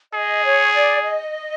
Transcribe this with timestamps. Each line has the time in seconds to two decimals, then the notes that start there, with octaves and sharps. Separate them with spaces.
0.13 G#4 D#5
0.43 C#5
0.73 D5
1.02 D#5